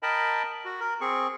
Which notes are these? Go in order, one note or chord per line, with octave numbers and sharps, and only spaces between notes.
A#4 D#5 G5 A5 B5
F#4
A#4
C4 G#4 C#6